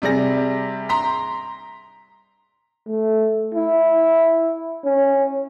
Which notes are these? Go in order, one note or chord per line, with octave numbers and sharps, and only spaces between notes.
C3 G3 G#4 A#6
A#5 C6 B6
A3
E4
C#4